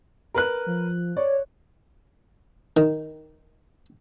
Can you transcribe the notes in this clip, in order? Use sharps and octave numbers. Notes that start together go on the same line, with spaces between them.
A#4 B4 F#6
F3
C#5 D5
D#3